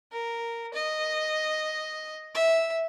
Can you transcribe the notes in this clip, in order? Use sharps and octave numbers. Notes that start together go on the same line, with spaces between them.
A#4
D#5
E5